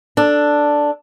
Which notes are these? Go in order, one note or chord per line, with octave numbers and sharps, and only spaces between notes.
D4 A4